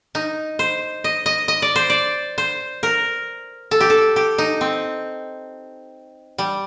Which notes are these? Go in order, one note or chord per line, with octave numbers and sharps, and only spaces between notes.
D#4
C5
D#5
D#5
D#5
D5
C5
D5
C5
A#4
A4
G4
A4
G4
D#4
C4
G3